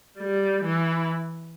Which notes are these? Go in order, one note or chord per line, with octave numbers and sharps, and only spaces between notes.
G3
E3